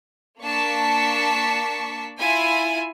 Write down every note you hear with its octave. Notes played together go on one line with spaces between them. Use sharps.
A#3 D4 A5 C#6 B6
E4 F4 G#5